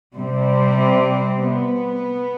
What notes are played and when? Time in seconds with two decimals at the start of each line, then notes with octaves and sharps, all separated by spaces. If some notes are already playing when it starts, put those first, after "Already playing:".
0.14 C3 G3 C4
1.45 B3